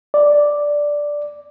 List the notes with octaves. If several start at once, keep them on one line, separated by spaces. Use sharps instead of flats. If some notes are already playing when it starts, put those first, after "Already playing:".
D5